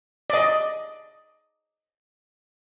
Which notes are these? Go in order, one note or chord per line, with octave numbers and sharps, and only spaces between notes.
D5 D#5